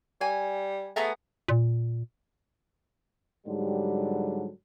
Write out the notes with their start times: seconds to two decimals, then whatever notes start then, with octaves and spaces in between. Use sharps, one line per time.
0.21 G3 G#5
0.96 A3 B3 G#4 A#5
1.48 A#2
3.47 G#2 D3 F#3 G3